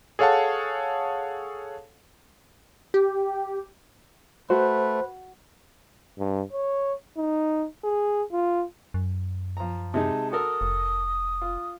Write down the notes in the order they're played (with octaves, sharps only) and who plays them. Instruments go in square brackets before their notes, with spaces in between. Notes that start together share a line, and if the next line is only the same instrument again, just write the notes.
[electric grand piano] G#4 A4 C#5 F5 F#5 A5
[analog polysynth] G4
[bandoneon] A3 [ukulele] F#4 [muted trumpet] B4 [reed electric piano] C5
[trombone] G2
C#5
D#4
G#4
F4
[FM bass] F#2
[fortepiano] F3 A#5
[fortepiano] C3 G#3 D#4 [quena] A5
[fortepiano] F#4 A4 A#4 [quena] D#6
[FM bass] F1
[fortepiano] F4